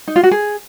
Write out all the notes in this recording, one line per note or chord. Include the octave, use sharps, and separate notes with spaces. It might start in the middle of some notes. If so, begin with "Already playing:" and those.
D#4
F4
F#4
G#4